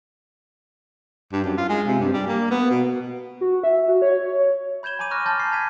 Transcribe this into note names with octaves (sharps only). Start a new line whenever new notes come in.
G2
F#2
F4
G#3
C3
G2
G3
A#3
B3
B2
F#4
E5
F#4
C#5
B5 G6 G#6 E7 G7
G#5 A#5 B5 D6 D#7
A#5 C#6 D6 F6 F#6 A#6
A5 C6 C#6 F6 G6 A6
C7
A#5 G#6 B6 D#7